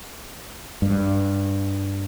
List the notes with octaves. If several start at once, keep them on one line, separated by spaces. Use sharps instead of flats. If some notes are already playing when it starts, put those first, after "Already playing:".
G2